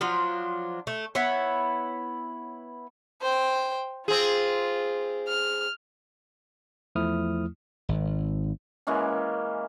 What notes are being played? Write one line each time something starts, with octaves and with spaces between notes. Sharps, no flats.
F3 F#3 D4 F4
A3
B3 E4 C#5
C5 G5
C4 F4 G#4
F6
E2 F3 A3 E4 D#6 F6
G#1
E3 G#3 A#3 C#4